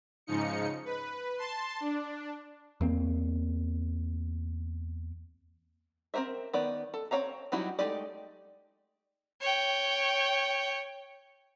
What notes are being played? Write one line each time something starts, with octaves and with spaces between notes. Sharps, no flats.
G#2 C#3 F3 D#4 C#7
B4
A5 C6
D4
E2 A#3 C4
C4 D#4 A#4 C5 E5
D#3 B3 D5
A4
C4 F#4 C#5 F5 A#5
F#3 G3 D#4 E4 F#4
G#3 A3 D#4 G4 D5
C#5 G5